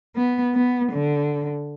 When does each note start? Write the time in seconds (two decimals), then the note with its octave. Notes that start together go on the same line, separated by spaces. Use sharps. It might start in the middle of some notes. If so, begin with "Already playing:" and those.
0.16 B3
0.55 B3
0.92 D3